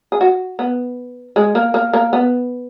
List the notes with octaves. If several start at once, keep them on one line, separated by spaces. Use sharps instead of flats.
G#4
F#4
B3
G#3
A#3
A#3
A#3
B3